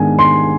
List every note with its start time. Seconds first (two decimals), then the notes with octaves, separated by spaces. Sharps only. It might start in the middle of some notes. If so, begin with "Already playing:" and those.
Already playing: G#2 D#3 G#3 B3 D4 G#5
0.19 C6